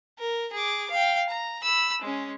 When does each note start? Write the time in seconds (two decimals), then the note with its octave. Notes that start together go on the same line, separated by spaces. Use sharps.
0.19 A#4
0.53 G#4 D6
0.91 F5 G5
1.30 A#5
1.63 B5 E6
2.01 G#3 C#4